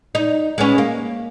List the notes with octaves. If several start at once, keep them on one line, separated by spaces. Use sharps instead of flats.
D#4
G#3 B3 C#4
A#3